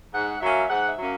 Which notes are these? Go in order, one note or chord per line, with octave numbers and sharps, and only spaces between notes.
G#2 F#5
F#3 A#3 C#4 E5
G#2 F#5
E5
F#3 A#3 C#4